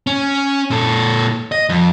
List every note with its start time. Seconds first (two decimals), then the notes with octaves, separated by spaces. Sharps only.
0.07 C#4
0.71 A#2 A4
1.52 D#5
1.69 F2